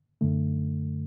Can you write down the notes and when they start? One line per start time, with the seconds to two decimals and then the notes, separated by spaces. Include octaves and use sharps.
0.21 F#2 D3 A3